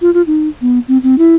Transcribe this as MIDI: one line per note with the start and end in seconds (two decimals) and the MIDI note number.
0.01 0.13 65
0.14 0.22 65
0.27 0.48 63
0.61 0.79 59
0.88 0.98 60
1.03 1.18 60
1.18 1.35 64